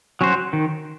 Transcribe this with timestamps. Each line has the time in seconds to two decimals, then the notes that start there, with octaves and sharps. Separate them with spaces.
0.21 F#3 C#4 F#4 C5
0.53 D#3